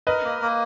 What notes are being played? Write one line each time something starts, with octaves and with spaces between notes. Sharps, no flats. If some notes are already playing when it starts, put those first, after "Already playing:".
A#4 B4 D#5
A#3
A#3